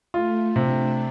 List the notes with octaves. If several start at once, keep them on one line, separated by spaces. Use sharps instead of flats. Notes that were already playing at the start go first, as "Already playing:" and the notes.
A3 F4
C3 D4